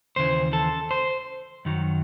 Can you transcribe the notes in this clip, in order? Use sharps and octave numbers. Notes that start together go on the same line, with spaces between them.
D#2 C#3 E3 C5
A4
C5
F#2 D#3 F#3